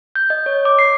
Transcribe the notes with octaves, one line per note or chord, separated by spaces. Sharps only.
G6
D#5
C#5
D6
C7